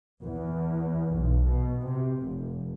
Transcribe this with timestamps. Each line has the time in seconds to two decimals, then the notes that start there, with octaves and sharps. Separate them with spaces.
0.22 E2
1.15 B1
1.47 B2
1.84 C3
2.22 F1